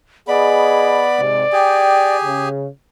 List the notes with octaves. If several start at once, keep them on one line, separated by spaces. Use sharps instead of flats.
B3 G#4 D5 D#5 B5
G#2 C3
G4 G#4 G5 G#5
C#3